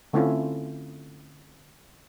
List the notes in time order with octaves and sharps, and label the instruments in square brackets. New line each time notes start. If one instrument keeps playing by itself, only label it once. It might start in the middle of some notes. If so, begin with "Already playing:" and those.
[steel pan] D3 A3 C4 C#4 E4 F4